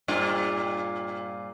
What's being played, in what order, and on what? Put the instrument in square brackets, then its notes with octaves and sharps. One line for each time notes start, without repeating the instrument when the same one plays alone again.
[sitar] G2 A#2 F4